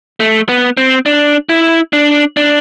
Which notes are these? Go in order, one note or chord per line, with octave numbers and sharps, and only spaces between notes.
A3
B3
C4
D4
E4
D4
D4